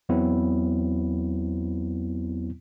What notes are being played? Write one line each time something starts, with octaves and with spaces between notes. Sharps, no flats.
E2 F#3 B3 C4 E4